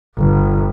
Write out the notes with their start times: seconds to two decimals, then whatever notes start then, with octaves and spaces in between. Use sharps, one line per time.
0.16 G1